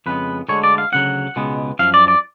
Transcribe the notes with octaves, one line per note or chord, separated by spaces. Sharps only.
F2 C#3 G#3 B3 B4
D2 D3 G#3 C#5
D5
F5
D2 C#3 F#3 F#5
C#2 B2 G#3 B3
F#2 F3 F5
D5
D5